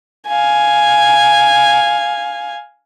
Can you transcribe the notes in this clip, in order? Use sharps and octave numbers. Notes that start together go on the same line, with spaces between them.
F5 G#5